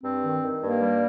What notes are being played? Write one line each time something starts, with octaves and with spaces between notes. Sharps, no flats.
G2 C4
D#3
D#3
G2 A#3
G3